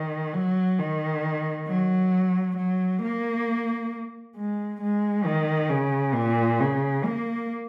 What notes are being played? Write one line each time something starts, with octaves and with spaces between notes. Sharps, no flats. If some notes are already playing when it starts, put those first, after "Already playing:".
Already playing: D#3
F#3
D#3
F#3
F#3
A#3
G#3
G#3
D#3
C#3
A#2
C#3
A#3